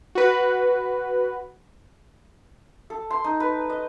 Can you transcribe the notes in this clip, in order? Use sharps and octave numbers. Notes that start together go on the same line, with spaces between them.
F#4 B4
A4
C6
D#4
B4
D#5